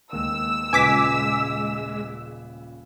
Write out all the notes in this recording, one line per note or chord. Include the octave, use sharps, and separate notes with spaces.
D#2 G#3 E6
D#1 C#3 G#3 B4 G#5 D6 B6